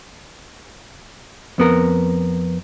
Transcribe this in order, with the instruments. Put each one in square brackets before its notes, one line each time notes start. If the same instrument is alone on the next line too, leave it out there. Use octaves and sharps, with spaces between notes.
[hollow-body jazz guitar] F2 B3 A#4